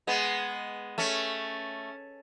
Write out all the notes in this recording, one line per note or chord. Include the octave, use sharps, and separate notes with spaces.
G#3 B3
A3 C#4